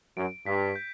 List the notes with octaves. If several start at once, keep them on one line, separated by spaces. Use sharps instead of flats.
F#2 D7
G2 B6
G6